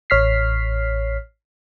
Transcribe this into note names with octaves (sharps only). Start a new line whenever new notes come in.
A1 C#5 F6 B6 C7